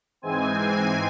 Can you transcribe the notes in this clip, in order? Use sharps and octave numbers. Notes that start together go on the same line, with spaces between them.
G#2 E3 G#3 C4 G#5